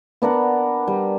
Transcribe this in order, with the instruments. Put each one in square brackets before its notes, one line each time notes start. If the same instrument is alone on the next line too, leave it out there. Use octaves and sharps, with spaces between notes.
[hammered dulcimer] B3 D4 A#4 F#5
G3